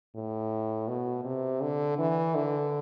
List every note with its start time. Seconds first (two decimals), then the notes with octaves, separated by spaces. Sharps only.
0.15 A2
0.88 B2
1.25 C3
1.61 D3
1.98 E3
2.35 D3